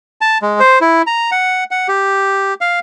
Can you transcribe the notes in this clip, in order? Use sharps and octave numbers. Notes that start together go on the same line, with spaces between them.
A5
G#3
C5
E4
A#5
F#5
F#5
G4
F5